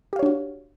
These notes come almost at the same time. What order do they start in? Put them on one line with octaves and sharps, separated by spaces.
G4 F5 C#5 D4 F#4